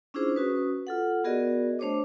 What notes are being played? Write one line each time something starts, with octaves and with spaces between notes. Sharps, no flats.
C#4 D4 E4 F4 G#4 C5
C#4 F#4 B4 D#6
F4 A4 F#5
B3 F#4 G#4 A#4 D5 D#5
A3 D4 C5 C#5 D#5 D6